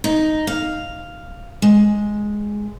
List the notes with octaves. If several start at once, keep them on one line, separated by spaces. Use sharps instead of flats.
D#4
F5
G#3